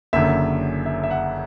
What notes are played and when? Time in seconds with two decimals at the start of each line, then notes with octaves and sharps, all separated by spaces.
0.13 F#1 F#2 D3 E5
0.86 E5
1.03 E5
1.11 F#5